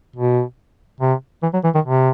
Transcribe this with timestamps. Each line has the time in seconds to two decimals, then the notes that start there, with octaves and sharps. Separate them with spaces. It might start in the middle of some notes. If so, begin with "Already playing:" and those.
0.16 B2
1.01 C3
1.43 E3
1.54 F#3
1.64 E3
1.75 D#3
1.85 C3